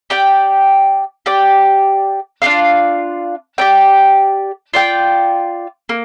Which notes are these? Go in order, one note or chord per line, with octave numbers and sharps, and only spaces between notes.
G4 D5 G5
G4 D5 G5
D4 F4 D5 F5
G4 D5 G5
F4 D5 G5
A#3